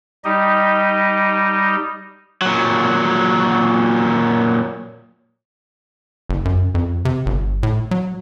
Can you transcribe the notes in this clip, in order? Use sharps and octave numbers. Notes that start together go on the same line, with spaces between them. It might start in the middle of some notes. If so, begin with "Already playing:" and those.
G3 D#4 G4 D#5
A#2 F#3
F#1
F#2
F2
C3
G1
A2
F#3